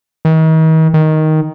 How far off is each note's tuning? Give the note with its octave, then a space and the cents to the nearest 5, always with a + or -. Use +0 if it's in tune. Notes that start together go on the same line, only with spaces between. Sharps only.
D#3 +40
D#3 +5